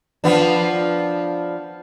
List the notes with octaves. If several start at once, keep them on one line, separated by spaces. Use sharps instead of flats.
F3 B3 D4